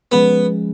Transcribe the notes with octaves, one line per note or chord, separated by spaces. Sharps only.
F3 G#3 B3 C#4 G#4